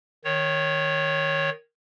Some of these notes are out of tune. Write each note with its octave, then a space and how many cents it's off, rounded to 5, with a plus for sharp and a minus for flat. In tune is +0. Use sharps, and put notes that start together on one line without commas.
D#3 +0 C#5 +0